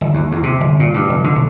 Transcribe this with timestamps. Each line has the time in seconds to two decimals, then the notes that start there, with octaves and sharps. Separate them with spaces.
0.01 G1
0.14 D#2
0.32 E2
0.43 C3
0.60 G1
0.80 A#2
0.94 G2
1.09 F1
1.24 D3
1.35 B1